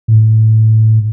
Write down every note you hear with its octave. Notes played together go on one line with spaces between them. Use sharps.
A2